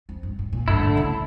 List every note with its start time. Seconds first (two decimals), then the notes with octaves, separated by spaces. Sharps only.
0.09 F2
0.23 G2
0.39 A2
0.53 A#2
0.68 G2 D3 A3 E4
0.82 A#2
0.97 C#3